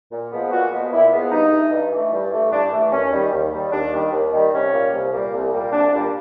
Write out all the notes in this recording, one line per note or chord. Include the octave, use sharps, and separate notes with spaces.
A#2
F3 G#3 B3
A#2 F#4
F3 G#3 B3
A#2 E4
F3 G#3 B3
G2 D#4
E3 A3
G2
E3 A3
G2
E3 A3
G2 D4
E3 A3
D#2 C#4
D#3 G3
D#2
D#3 G3
D#2 D4
D#3 G3
D#2
D#3 G3
C2 C#4
A#2 G3 A#3
C2
A#2 G3 A#3
C2
A#2 G3 A#3
C2 D4
A#2 G3 A#3